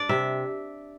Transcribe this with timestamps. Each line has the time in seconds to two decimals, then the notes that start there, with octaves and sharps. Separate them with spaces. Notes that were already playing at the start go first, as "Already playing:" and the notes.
Already playing: D4 D5
0.09 C3 E5